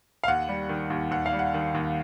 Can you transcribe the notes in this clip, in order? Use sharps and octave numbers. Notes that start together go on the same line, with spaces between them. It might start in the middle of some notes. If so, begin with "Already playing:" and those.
F5
D#2 F#5
G3
D#3
D#2
D#2 F#5
F5
G3
F#5
D#3
D#2